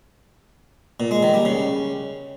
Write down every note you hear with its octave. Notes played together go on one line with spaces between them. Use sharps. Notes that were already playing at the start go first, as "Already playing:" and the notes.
A#2
G#3
D#3
G3
C#3